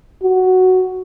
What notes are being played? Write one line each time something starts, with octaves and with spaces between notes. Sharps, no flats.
F#4